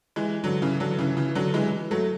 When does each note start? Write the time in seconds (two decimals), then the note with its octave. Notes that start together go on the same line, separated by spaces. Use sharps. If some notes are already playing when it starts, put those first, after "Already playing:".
0.16 E3 G#3
0.44 D3 F#3
0.62 C#3 E3
0.80 D3 F#3
0.99 C#3 E3
1.17 C#3 E3
1.35 D3 F#3
1.54 E3 G#3
1.91 F#3 A3